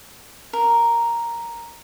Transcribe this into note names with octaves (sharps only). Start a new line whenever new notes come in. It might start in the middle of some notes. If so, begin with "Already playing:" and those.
A#4